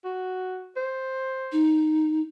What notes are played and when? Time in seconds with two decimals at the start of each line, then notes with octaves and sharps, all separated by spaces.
0.04 F#4
0.76 C5
1.52 D#4